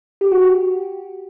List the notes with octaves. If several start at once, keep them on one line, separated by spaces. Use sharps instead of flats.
G4
F#4
G4